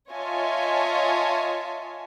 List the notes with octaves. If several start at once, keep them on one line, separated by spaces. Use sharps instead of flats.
F4 C#5 D#5 E5 G#5 A5